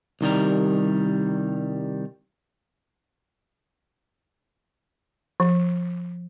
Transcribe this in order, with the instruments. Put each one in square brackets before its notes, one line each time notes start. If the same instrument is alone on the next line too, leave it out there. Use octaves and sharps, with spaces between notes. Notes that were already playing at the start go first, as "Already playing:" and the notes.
[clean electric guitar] C2 D#3 G3 A#4
[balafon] F3